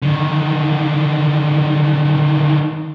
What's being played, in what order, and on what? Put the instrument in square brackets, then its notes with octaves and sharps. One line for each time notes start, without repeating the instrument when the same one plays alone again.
[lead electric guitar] D3 D#3